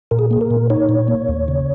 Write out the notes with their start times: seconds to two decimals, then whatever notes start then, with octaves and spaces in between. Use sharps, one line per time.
0.11 A#2 A#4
0.19 G#4
0.31 A#3 G#4
0.41 A#4
0.51 A#2
0.70 D#4 C#5
0.89 A#2
1.08 A#3
1.28 D#2
1.48 C#3